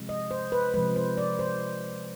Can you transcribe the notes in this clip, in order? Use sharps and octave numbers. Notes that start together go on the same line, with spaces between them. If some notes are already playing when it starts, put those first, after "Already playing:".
Already playing: C3 F3 G#3
D#5
C5
B4
C3 F3 G#3 B4
C5
D5
C5